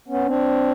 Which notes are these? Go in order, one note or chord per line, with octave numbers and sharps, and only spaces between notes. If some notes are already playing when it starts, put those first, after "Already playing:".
B3 C#4
C4 D4